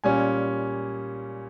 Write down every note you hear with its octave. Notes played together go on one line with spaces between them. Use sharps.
A#2 G3 C#4 G#5